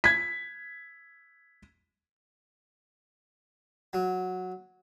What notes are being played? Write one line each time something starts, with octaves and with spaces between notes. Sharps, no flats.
G#6 B6
F#3